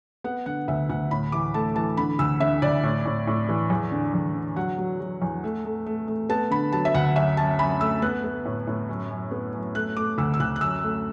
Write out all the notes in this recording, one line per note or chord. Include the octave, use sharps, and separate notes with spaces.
B3 F#5
D3 F#5
D2 E5
D2 F#5
A2 B5
E3 D6
A3 A5
E3 A5
D3 B5
D2 E6
D3 E5
D2 D5
A2
A2
A2
E3
E2
D3
E2
D3
F#3 F#5
F#3
F#3
E2
A3
A3
A3
A3
B3 A5
D3 B5
F#3 A5
E5
D2 F#5
F#2 E5
F#2 A5
F#2 B5
A3 E6
B3 F#6
B3
A2
A2
F#2
F#2
B3
F#2
A3 F#6
A3 D6
D2 E6
E6
D2 F#6
F#6
F#2 E6
A3